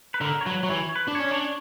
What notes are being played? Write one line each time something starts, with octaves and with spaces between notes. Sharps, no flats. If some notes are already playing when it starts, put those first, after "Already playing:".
B4
D3 A#4
C#5
F#3 B4
F#3
E3 C#5
B4
D4
C#4 C#5
D4 C#5